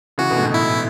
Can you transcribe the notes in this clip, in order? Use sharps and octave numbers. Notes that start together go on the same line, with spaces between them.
C#3 E3 F#4
B2 D3
A2
G#2 B2
E4